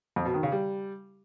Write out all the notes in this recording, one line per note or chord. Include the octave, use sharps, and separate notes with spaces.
F2
B2
D#3
C#3
G3